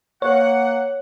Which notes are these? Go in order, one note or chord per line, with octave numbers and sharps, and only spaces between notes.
A#3 C#5 F#5